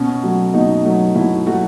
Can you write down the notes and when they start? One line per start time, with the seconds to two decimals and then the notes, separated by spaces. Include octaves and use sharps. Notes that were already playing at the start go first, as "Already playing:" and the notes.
Already playing: B2 C#4
0.23 F#3 A3
0.54 B2 D#4
0.85 F#3 A3
1.15 B2 E4
1.46 A3 F#4
1.50 F#3